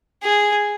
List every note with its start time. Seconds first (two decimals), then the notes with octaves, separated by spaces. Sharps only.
0.23 G#4